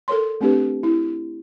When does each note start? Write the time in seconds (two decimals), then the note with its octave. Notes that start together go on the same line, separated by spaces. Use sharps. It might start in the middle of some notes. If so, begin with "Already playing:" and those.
0.08 A4 A#4 C#5 C6
0.41 A3 C4 D4 G4 B4
0.83 E4